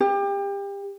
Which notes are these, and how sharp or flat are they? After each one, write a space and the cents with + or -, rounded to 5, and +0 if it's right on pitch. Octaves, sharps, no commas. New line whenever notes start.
G4 +30